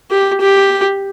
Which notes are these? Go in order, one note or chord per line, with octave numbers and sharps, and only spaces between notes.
G4
G4